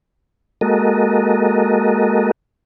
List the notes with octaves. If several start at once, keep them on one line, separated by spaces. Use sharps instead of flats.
G#3 A#3 F#4 A4 A#4 D#5